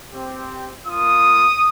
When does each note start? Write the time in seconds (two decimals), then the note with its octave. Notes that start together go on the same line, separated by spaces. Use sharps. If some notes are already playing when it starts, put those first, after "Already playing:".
0.11 C4 G4
0.86 A#3 F4 D#6